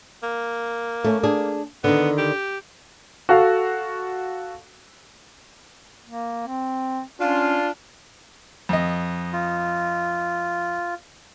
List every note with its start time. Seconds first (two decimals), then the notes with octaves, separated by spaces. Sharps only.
0.23 A#3
1.04 A3 C#4
1.23 D4 G#4
1.84 D3 D#3 B3
2.18 G4
3.29 F#4 A4 F5
6.06 A#3
6.47 C4
7.20 C#4 D4 F4
8.69 F2 D#5
9.33 F4